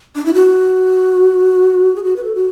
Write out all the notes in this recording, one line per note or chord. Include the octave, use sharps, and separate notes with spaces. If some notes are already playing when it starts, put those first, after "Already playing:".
D4
E4
F#4
G#4
F#4
B4
A4
F#4